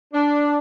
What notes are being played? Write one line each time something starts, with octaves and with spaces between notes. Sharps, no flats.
D4